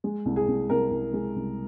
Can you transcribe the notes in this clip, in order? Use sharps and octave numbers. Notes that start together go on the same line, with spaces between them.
G#3
C2
G#4
C2
C2 A#4
C2
G#3
C2